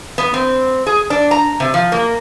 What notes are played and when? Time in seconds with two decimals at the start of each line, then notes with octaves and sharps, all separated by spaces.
0.18 B3
0.34 C4
0.87 G#4
1.10 D4
1.31 A#5
1.60 C3
1.74 F3
1.92 A#3